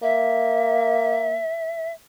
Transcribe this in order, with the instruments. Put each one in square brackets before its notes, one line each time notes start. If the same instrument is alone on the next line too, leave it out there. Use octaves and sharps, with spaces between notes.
[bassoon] A#3 [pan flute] E5